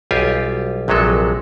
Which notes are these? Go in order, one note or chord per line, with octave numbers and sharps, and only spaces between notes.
B1 G3 F4 G4 G#5
A#1 C3 F#3 G#3 A4